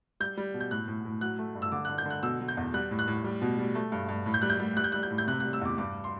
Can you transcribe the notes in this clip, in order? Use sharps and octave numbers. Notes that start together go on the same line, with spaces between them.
G3 G6
G3
B2
G6
A2 F#6
A2
A2
F#3 F#6
A3
G2
E6
D3 D6
F#6
D3
G6
D3 F#6
B2 E6
F#3
G6
E2
G3 F#6
A2
F#6
A2
G3
B2
G3
A3
G2
G2
A2
G6
G3 F#6
G6
G3
G3 F#6
G6
G3 F#6
G6
A2
G6
C3 F#6
F#6
G3
E6
E2 D6
G2 D6
C6